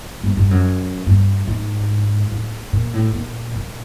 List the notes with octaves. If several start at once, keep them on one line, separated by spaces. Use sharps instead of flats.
G2
G2
F#2
G2
G#2
A2
A#2
A2
A#2
A#2